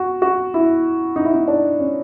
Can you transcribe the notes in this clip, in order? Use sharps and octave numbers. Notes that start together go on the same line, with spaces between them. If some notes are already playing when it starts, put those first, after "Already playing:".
Already playing: F#4
F#4
E4
D#4
E4
D#4
D4
C#4